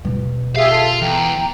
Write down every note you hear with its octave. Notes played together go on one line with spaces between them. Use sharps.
D#2 B2
F4 G4 G#4 E5 F5
A4
E2 G5 A#5